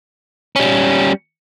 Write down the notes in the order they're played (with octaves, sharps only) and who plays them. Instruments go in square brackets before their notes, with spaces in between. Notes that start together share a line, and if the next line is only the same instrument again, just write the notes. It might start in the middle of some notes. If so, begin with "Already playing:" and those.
[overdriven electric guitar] G3 C#4